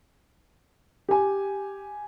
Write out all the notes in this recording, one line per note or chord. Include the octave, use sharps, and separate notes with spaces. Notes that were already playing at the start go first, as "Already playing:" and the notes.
G4 G#5